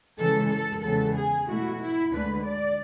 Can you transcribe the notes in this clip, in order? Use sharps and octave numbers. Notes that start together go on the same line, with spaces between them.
C#3 E3 G#3 A4
A4
E2 C#3 E3 G#3 B3 A4
G#4
B2 F#3 A3 E4 F#4
E4
D2 D3 G#3 D4 B4
D5